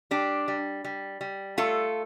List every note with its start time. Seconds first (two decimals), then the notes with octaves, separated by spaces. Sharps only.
0.11 G3 D4 G4
0.48 G3
0.84 G3
1.21 G3
1.58 A3 F4 A4